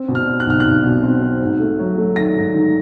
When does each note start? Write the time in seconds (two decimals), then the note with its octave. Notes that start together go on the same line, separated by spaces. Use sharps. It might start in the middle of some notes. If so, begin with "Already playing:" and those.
Already playing: C4
0.08 B2
0.15 F6
0.28 C4
0.40 F#6
0.47 B1 F6
0.60 F#6
0.65 B1
0.84 B2
1.03 C4
1.22 C4
1.41 G#2
1.60 A3
1.79 F#3
1.98 A3
2.16 D#3 A#6
2.36 G#2
2.54 D#3